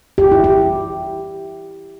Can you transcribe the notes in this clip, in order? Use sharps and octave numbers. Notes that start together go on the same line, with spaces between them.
G4
E4
G4